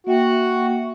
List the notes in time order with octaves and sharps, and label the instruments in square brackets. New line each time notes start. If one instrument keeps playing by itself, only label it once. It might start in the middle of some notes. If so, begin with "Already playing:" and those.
[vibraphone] A#3 E5 G5 [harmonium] F#4